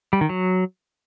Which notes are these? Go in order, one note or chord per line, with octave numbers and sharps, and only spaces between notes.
G3
D#3
F#3